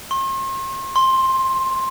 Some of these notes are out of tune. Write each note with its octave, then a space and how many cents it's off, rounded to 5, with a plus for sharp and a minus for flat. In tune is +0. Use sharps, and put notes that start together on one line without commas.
C6 +45
C6 +10